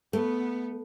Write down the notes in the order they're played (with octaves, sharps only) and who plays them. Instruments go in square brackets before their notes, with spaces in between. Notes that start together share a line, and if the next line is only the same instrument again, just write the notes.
[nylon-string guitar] A3 [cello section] B3